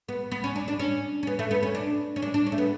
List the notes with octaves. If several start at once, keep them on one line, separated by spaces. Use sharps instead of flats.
B3
B3
C#4
D4
D4
C#4
C#4
B3
A3
B3
C#4
D4
C#4
D4
D4
C#4
A3
B3